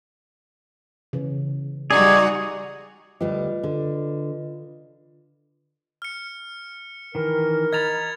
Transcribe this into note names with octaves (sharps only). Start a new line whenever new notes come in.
C#3 E3
G3 D#4 F#4 G#4 D5
D2 G3 F4 G4 B4 D#5
D3
F6 C#7
D#3 E3 A#4
D#5 A#5 B5 G#6 A6 F7